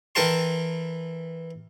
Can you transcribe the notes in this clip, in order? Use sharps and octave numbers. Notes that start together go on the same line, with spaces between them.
E3 A4 A#4 G5 A5 C6